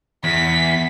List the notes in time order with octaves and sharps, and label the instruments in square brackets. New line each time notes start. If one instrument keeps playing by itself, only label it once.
[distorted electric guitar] E2 [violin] B6